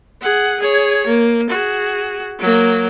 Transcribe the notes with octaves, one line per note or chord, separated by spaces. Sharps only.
G#4 F#5
G#4 C#5
A#3
F#4 G#4
F#3 A#3